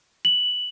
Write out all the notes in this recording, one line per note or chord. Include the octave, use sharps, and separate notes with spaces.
F#7